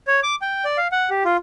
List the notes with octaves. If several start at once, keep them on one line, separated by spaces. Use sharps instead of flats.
C#5
D6
G5
D5
F5
F#5
G4
F4